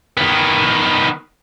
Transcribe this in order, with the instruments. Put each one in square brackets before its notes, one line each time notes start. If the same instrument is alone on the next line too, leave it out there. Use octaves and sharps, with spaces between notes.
[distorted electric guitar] D#3 B3